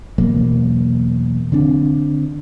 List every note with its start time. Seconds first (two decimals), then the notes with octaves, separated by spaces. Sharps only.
0.18 E2 B2 F#3 A#3
1.52 D3 C4 D4